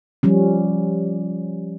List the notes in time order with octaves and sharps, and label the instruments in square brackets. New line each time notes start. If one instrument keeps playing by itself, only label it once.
[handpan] F3 G3 C#4